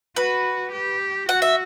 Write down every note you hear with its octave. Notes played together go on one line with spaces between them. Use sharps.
F#4 B4
G4
F#4 F#5
E5